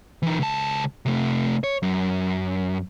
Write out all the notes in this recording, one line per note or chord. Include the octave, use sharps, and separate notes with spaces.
E3 D#4
C#2 A5
C3 A3
C#5
F#2